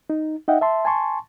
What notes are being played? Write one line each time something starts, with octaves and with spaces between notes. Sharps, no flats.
D#4
D#4 D#5 E5 F#5 G5
E5 A5 C6
G#5 A5 C6 C#6